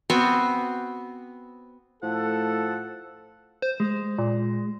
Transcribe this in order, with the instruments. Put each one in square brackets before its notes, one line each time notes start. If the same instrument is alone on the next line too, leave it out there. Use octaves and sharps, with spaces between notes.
[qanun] B3 C4 F#4 C#6
[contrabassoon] A2 [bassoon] F3 [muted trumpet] A4 [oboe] F#5
[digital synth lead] C5
[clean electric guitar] G#3
[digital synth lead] A#2